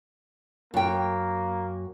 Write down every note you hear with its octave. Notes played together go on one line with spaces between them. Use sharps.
F#2 A#3 G5